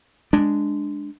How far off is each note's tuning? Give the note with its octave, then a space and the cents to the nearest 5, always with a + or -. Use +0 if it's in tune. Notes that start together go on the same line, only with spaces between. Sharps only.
G#3 +0 D4 +0